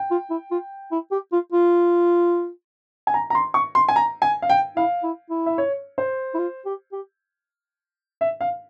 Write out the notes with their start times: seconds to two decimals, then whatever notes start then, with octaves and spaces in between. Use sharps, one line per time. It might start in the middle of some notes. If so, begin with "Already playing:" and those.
Already playing: G5
0.11 F4
0.30 E4
0.51 F4
0.92 E4
1.12 G4
1.32 F4
1.52 F4
3.07 G#5
3.14 A#5
3.30 A#5
3.35 C6
3.54 C#6
3.75 C6
3.89 G#5
3.96 A#5
4.22 G#5
4.42 F5
4.50 G5
4.77 E4 F5
5.03 E4
5.30 E4
5.46 E5
5.58 C#5
5.98 C5
6.34 E4
6.39 F4
6.66 G4
6.92 G4
8.21 E5
8.41 F5